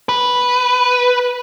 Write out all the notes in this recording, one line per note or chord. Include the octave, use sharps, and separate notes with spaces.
B4